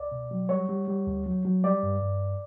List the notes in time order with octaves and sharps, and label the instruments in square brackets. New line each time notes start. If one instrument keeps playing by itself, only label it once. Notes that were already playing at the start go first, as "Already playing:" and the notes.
Already playing: [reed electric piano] C#2 D5
B2
F#3
G3 C#5
G3
G3
D2
F#3
F#3
G3 D5
G2
G2